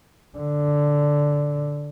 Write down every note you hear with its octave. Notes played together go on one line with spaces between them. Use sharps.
D3